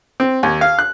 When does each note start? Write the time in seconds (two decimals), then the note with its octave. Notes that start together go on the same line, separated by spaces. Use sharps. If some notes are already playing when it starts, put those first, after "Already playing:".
0.20 C4
0.43 D#2
0.61 F5
0.79 F#6